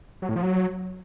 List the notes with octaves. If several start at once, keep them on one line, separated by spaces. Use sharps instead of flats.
F#3
A2
F3
F#3